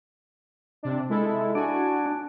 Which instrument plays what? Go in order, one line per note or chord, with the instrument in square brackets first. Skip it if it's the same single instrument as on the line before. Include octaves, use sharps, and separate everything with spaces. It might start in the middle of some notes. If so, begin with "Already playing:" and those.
[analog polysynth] C3 D4
G#3 E4 A4
[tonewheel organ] D4 [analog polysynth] F#4 G#5